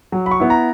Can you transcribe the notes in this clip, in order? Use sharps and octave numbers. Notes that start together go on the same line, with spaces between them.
F#3
B5
C#6
B3 E4
A#5